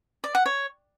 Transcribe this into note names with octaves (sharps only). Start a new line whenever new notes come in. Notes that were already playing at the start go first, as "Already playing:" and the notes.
D5
F#5
C#5